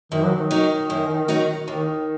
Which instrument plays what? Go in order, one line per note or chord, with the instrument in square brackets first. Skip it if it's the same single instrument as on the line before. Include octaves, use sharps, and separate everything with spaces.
[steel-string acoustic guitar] F#2 [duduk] D#3
[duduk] F#3
D#3
[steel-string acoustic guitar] F#3 D#4 F#4
F#2
F#3 D#4 F#4
[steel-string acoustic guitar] D#2 [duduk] D#3